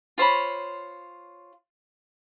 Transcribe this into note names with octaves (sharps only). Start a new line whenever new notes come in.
F4 C5 C#5 B5